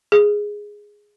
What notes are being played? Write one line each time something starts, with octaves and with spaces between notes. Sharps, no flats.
G#4